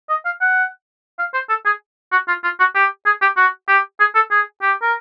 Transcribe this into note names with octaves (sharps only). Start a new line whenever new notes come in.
D#5
F5
F#5
F5
C5
A4
G#4
F#4
F4
F4
F#4
G4
G#4
G4
F#4
G4
G#4
A4
G#4
G4
A#4